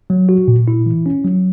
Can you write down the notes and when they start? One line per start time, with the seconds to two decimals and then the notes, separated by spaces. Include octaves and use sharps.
0.10 F#3
0.29 F#4
0.48 A#2
0.68 E4
0.86 E3
1.06 C#4
1.25 F#3